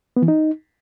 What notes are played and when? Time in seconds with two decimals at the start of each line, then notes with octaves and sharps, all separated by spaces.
0.17 B3
0.22 E3
0.28 D#4